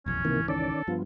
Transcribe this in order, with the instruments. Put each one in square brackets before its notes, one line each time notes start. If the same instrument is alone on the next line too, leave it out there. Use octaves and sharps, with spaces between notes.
[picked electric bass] F1 B1 E2 [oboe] C#4
[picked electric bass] G#1 C#2 E3 [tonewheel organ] C3 D#3 A#3
[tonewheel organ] D#3 C#4 D5 [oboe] A4
[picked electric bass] G2 [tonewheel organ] F3 B3 F4